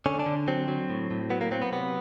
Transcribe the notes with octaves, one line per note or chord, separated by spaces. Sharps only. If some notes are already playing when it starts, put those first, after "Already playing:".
D3 C#4
D4
D3
F#3 C4
F#3
A2
A2
F#3 B3
A#3
F#3 C4
B3
C3 B3